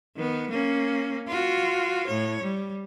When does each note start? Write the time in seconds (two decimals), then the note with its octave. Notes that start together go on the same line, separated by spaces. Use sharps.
0.16 D#3 B3
0.50 A#3 C#4
1.28 F4 F#4
2.07 A2 C#5
2.43 G3